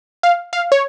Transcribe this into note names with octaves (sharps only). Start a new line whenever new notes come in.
F5
F5
C#5